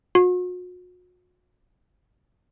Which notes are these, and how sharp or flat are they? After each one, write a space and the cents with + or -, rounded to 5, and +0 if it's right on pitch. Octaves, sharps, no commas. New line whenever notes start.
F#4 -40